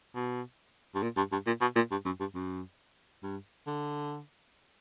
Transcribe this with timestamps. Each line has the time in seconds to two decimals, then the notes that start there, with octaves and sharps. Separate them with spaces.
0.15 B2
0.95 G2
1.03 A#2
1.17 G2
1.32 G2
1.47 A#2
1.61 B2
1.76 A#2
1.91 G2
2.06 F#2
2.20 G2
2.35 F#2
3.23 G2
3.67 D3